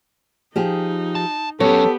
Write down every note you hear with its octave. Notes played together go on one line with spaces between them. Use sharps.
F3 D#4 G4 G#4
A5
F#3 B3 C#4 G4 A4 C#5